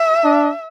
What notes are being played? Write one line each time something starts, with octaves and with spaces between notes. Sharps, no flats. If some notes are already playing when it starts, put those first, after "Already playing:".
Already playing: E5
D4